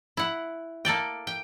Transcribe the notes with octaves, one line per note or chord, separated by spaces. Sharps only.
E4 F#5
A#3 A4 D5 G5
G5